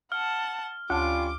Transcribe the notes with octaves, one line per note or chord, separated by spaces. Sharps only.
F#5 A5 F6
D2 G3 C#4 F4 A5 D6